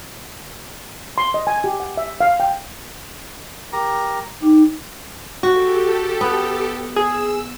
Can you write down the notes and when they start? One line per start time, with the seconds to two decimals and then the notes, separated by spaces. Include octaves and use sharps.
1.18 C6
1.34 D#5
1.47 G#5
1.64 G4
1.80 F#5
1.97 E5
2.21 F5
2.40 G5
3.73 G4 A#4 A#5
4.42 D#4 G4
5.43 F#4 G4 A4
6.21 B3
6.96 G#4 E6